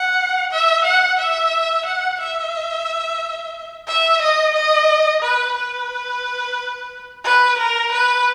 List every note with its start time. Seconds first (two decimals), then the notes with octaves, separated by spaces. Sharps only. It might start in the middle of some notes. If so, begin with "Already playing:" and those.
Already playing: F#5
0.52 E5
0.85 F#5
1.19 E5
1.85 F#5
2.20 E5
3.87 E5
4.22 D#5
4.55 D#5
5.22 B4
5.57 B4
7.24 B4
7.58 A#4
7.92 B4